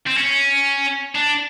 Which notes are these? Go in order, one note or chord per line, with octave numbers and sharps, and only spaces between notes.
C4
C#4
D4